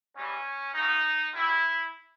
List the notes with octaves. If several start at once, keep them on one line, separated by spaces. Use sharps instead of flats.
G#2 E3 G3 C#4
F#2 C#3 F#3 D#4
B2 G3 E4